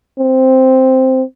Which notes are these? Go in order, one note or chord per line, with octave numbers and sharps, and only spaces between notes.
C4